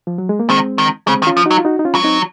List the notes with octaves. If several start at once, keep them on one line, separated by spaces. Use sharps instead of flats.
F3
F#3
G#3
A#3
D#3 G#3 C4
D#3
C#3 G#3 C4
D#3
C#4 F4
F3
F#3 D#4 F#4
F4
D#4 F#4
D#4
C#4 F4
F#3
C4 D#4